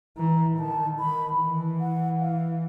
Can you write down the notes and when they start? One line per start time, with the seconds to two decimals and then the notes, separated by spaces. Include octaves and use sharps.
0.18 E3 A#5
0.58 D#3 A5
0.99 D#3 B5
1.39 E3
1.80 F#5
2.20 F5